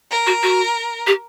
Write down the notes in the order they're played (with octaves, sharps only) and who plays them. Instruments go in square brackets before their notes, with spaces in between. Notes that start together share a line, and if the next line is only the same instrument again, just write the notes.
[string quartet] A#4
[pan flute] F#4
F#4
G4